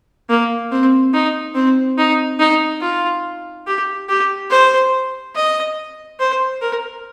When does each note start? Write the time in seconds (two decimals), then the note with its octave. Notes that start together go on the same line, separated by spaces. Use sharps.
0.30 A#3
0.72 C4
1.14 D#4
1.55 C4
1.98 D#4
2.39 D#4
2.81 F4
3.67 G4
4.09 G4
4.50 C5
5.36 D#5
6.20 C5
6.61 A#4